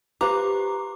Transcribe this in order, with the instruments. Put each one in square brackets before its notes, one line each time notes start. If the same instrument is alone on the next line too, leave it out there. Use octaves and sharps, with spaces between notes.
[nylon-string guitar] F4 B4 C5 [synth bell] G4 D6 [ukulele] A#5